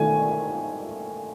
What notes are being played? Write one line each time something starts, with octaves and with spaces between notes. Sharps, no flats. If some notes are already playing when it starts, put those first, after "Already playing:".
Already playing: D#3 A3 G#5